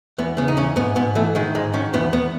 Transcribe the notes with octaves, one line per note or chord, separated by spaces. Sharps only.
E2 B3
C#3 B3
D#4
E2 C#4
G#2 B3
G#2 B3
E3 A3
D#3 G#3
G#2 G#3
D#3 C#4
E2 B3
E2 B3